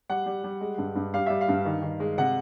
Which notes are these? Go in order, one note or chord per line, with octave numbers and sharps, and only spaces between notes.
G3 F#5
G3
G3
G#3
G2
G2
G3 F5
G3 E5
F5
G2
D#3
D#3
G#3
C3 F#5